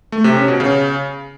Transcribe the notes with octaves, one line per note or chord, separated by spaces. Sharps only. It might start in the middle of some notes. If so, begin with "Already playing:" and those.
A3
C3
C#4
B2
C#3